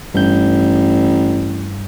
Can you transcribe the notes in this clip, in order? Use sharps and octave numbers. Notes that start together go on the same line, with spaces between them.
A1 G2 G6